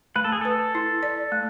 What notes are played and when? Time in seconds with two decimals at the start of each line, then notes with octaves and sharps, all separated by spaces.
0.16 A3 B4
0.24 A4
0.32 G#4
0.41 A4 B4
0.75 E4
1.03 D5
1.32 A3